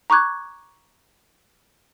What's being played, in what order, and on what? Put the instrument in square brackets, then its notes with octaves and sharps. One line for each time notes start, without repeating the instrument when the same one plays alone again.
[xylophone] A#5 C#6 D6 F#6 G#6